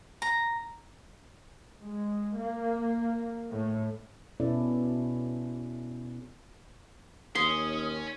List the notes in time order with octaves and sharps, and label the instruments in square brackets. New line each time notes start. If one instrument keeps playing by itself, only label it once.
[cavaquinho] A#5
[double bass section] G#3
A#3
A2
[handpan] B2 C#4 E4 A4 D5
[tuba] D#2 [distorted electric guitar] C#4 [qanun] C6 [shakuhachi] D#6